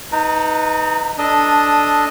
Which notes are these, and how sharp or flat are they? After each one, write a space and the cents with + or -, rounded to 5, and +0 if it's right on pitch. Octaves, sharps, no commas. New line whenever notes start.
D#4 +10 B4 +0 A#5 -35
D4 +0 A4 -10 D#5 +0